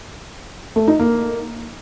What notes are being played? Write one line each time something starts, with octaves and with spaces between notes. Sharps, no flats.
A3
D#4
A#3